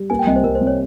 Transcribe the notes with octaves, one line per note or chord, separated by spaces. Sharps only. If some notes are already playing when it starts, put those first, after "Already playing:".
Already playing: G3
A#3 G#5
G5
C2 D#5
C5
C2 A#4
C5
C2
C#5